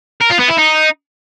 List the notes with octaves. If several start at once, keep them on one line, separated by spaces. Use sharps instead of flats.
A#4
F4
B3
E4
D#4